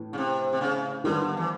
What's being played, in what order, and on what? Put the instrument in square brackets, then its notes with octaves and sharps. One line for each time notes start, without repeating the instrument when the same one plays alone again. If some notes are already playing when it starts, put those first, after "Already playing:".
Already playing: [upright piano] A2 E3
[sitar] C#3
C3
C3
C#3
[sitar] D3 [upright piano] D#3 G3 B3
[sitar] E3